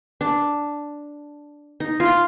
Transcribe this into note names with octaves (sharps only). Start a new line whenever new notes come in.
D4
D#4
F4